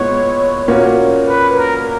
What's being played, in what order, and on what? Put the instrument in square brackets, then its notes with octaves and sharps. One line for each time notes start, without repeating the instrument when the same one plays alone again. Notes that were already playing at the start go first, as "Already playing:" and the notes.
Already playing: [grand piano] A#2 G#3 B3 E4 [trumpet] C#5
[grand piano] A#2 A#3 C#4 F#4
[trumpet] B4
A#4